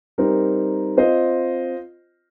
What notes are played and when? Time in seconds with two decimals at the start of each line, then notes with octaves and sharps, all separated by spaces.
0.18 G3 C4 D#4 A#4
0.97 C4 F4 C5 D#5